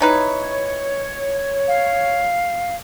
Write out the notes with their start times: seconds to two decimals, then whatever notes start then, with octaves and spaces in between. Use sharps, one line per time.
0.01 E3 D#4 B4 C#5
1.68 F5